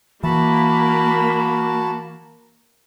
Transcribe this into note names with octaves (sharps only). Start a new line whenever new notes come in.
E3 A#3 F#4 A5 B5